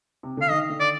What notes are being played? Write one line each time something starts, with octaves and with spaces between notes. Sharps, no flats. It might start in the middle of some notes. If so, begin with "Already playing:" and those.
C3
D3 F5
D#3 D#5
D3
D5